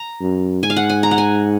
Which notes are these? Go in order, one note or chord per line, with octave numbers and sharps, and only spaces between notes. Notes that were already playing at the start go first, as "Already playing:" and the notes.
Already playing: A#5
F#2
G#2 G#5
F5
F#5
G#5
A#5
F#5
G#5